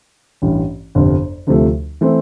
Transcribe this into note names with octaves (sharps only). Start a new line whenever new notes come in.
A1 G2 E3
G1 F2 C3
D2 C3 F3 A3
E3 A3 C4